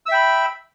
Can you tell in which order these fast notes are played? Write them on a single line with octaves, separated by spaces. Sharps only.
E6 E5 G5 B5